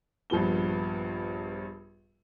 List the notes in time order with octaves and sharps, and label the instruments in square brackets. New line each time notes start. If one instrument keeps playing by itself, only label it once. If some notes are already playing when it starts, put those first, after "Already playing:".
[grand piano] A#1 G2 F3 B3 G7